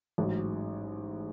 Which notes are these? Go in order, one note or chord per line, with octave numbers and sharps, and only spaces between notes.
A1 G#2 F#3